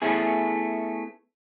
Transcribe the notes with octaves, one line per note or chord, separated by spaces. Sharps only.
A3 B3 C#4 E4 G#4